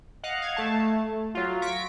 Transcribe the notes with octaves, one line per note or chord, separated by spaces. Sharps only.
D#5 F5 F#5 F#6
F5 G#6
A3 A5
A3
F#3 F4
C#6 A#6 B6 D7